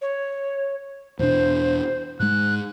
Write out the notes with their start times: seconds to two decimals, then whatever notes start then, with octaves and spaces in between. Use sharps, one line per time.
0.01 C#5
1.19 E2 B2 D4 C5
2.20 G#2 G#3 F#6